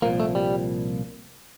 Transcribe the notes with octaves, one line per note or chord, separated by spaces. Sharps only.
C2 A#2 F3 A#3
A3
G3